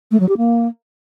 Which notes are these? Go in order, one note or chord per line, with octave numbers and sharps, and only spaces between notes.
A3
F#3
G4
A#3